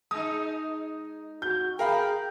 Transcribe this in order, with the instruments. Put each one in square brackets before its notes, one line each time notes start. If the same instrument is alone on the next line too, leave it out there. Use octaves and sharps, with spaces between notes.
[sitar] G#3 D#4 [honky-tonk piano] D#6
[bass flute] F#4 [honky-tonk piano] G6
[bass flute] G#4 [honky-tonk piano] A#4 F5 B5 [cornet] G5